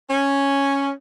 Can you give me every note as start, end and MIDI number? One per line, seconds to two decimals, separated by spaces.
0.10 0.91 61